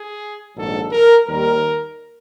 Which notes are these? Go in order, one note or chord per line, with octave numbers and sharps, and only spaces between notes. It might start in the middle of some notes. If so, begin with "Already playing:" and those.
Already playing: G#4
A#1 G#2 D#3 F#3 A4
A#4
D#2 D#3 G3 A#4